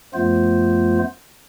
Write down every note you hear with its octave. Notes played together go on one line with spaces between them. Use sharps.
F#2 F3 A3 B3 F4 C5